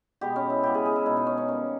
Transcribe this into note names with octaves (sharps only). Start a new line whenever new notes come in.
B2 G#3 B3 G4
C#4
E4
C#3 E3 G#3 B3 G4
G#4
G#4
E4
B2 G#3 B3 D#4
D#4
C#4
C#4
D#3 G3 A#3 C#4